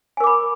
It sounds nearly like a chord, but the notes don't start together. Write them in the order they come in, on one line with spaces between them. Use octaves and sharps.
G#5 A#4 D6 B5